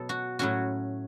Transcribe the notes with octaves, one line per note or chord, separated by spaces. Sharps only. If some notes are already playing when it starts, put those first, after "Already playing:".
Already playing: B2 F#3 B3 A4
F#4
A2 F#3 C#4 F#4